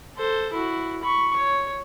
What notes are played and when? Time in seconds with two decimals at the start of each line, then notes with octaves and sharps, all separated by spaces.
0.17 A4 C5
0.53 E4 F#4
1.04 B5 C#6
1.36 C#5